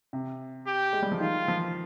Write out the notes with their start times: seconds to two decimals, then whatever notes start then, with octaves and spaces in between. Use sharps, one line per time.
0.13 C3
0.67 G4
0.93 G#3
1.02 G3
1.12 F3
1.20 D#3 F4
1.48 F3